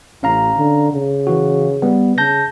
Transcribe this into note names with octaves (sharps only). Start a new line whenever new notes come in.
A1 C#4 F5 A#5
D3
C#3
E3 F#4
G3 B3
C#3 A5 G6 A#6